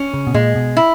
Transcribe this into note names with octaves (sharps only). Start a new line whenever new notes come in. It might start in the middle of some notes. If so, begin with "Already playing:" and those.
Already playing: C#4
C#3
B2
A#2 G#3
B2
E4